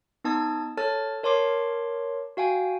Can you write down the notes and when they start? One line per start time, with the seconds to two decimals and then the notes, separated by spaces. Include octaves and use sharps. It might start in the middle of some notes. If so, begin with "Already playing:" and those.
0.24 B3 D#4 A5 D#6 G#6
0.77 A4 C#5 A5 F6 A6
1.23 A#4 C#5 A5 C6 D6 C7
2.37 F#4 F5 G5 G#5